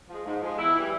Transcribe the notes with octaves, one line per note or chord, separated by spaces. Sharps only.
F3 G#3
G#2
F3 G#3
E2 E4
E3 G3